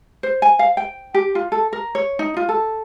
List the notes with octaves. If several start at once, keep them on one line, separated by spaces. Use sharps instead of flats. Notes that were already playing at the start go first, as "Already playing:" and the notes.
C5
G#5
F5
G5
G4
F4
A4
A#4
C#5
D#4
F4
A4